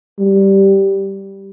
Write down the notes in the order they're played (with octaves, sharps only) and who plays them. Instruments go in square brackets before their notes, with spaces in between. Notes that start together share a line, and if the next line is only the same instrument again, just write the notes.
[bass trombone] G3